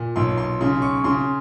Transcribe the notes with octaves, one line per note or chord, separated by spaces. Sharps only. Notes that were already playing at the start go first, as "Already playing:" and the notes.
Already playing: A#2
B1 C6
C6
C#3 C6
C#6
C#3 C6